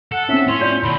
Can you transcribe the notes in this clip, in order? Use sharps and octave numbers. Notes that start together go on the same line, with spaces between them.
A4 F#5
C4 C#4 E5
A2 C#4 C6
F4 C#5 D5
D#2 B2 B5